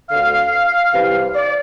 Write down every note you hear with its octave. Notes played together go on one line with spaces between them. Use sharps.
D2 D3 F5
C2 C3 E3
D5